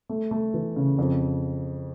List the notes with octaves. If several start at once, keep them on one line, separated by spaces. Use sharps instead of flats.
A3
A3
E3
C#3
F2